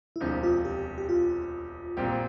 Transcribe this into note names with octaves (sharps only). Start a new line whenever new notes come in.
E4
E1 D2 C3 F3 D4
F4
G4
G4
F4
A#1 A#2 G3 C4 G4